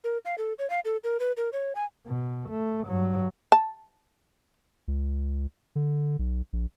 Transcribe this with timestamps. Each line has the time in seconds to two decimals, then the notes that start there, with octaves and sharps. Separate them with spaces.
0.04 A#4
0.25 F5
0.38 A4
0.59 C#5
0.70 F5
0.85 A4
1.04 A#4
1.20 B4
1.37 A#4
1.53 C#5
1.75 G#5
2.06 B2
2.49 A3
2.87 G2 F#3
3.52 A5
4.88 C#2
5.75 D3
6.19 B1
6.53 A#1